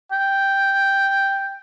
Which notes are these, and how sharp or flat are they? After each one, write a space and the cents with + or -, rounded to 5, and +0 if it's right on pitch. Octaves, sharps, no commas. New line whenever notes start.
G5 +0